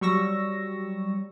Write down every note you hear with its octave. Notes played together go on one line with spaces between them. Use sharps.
F#3 G3 C#6 E6 A#6